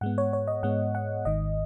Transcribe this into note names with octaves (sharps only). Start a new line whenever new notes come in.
G#2 G#3 B3 F#5
C#5
C#5
D#5
G#2 G#3 B3 F#5
F#5
G#1 G#2 D#3 D#5